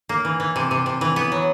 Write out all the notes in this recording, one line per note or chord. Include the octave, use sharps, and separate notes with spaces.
A#3
E3
E3
C3
C3
C3
E3
B3
F#3